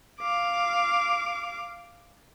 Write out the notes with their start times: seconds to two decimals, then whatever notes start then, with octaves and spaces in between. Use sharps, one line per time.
0.21 F5 D6